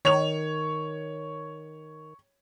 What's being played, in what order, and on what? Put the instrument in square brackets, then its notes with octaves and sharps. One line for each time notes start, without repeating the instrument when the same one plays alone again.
[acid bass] D#3 [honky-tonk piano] C#5 F7